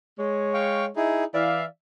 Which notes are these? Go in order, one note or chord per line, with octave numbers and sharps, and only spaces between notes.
G#3 C#5
F5 G5 C#6
D#4 E4 G#4
E3 D5 E5 F5